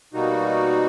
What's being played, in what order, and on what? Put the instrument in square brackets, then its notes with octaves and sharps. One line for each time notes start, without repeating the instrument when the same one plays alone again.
[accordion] B2 G3 A#3 D#4 F#4